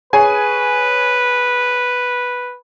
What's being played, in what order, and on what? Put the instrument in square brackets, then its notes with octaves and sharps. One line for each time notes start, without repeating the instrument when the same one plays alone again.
[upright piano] G#4 C#5 G#5 [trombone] B4